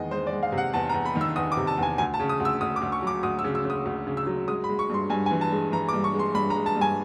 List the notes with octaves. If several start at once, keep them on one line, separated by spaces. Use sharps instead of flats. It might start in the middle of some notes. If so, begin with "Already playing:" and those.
Already playing: E2 D#3 G#3 D#5
G#3 C5
D5
G#3
F5
C3
F#5
E2 A5
A#5
E2
B5
D#3
E6
E2 D#6
D6
C3
A5
E2 G#5
D2 G#5
A5
C#3
D#6
D2
E6
D2 D#6
D6
D2
C#6
F#3 D6
D2 D#6
E6
C#3
E6
C#3 D#6
D2
C#3
E6
F#3
G#3 D#6
B5
G#3
C#6
G2 C6
G2 G#5
G#5
E3
A5
G#3
E3 A#5
D6
G2
C#6
G#3
C6
G2 B5
A#5
G#3
A5
G2
G#5